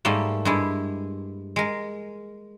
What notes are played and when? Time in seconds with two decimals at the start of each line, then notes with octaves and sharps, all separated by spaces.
0.05 G#2 G3 A3 A#3
0.45 G2 G#3 E4
1.56 G#3 A#4